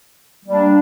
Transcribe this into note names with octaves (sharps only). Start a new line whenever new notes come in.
G3 A#3 D4